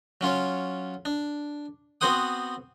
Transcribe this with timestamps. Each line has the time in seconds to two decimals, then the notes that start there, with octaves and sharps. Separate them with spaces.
0.21 F#3 C#4 F4 C#5
1.05 D4
2.01 B3 C4 F#4 C5 F#5 D#6